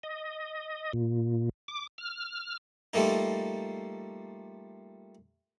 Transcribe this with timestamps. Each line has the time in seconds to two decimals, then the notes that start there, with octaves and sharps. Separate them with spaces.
0.03 D#5
0.93 A#2
1.68 D6
1.98 F6
2.94 F3 G3 A3 A#3 D#4